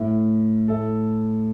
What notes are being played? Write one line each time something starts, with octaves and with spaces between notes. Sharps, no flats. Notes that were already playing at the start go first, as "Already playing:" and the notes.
Already playing: A2
A2 A4